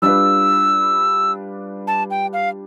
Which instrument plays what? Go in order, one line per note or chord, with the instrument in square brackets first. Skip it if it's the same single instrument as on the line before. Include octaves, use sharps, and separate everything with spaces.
[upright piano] G3 D4 F4 B4 [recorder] E6
[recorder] A5
G5
F5